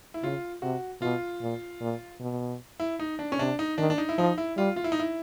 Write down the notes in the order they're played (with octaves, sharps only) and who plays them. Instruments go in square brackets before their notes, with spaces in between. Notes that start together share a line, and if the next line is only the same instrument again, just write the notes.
[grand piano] E4
[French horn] C#3 [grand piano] F4
[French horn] C3 [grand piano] F#4
[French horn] B2 [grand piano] F4
[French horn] A#2
A#2
B2
[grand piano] E4
D#4
D4
C#4
[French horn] C3 [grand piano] D4
[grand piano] D#4
[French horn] D#3 [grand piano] D4
[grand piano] D4
D#4
E4
[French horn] F3 [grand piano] D#4
[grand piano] E4
[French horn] G3 [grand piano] F4
[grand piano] F4
E4
D#4
E4